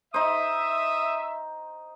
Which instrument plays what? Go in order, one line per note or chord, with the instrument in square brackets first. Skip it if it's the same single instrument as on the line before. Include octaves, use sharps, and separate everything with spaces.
[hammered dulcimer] D#4 C5 [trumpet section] E5 [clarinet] D#6